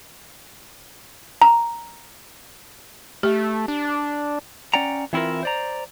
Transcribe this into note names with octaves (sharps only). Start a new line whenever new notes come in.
A#5
A3 G4
D4
C#4 D5 F#5 G5 A#5
E3 C4 E4 F4 A#4
C5 D5 A#5